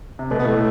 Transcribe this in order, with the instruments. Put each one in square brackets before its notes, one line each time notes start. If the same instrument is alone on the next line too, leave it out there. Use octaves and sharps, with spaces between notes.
[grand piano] C3
[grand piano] B2 [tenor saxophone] A3
[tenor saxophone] B3
[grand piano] A2 [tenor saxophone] A3